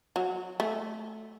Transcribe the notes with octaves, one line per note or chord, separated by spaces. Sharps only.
F#3
A3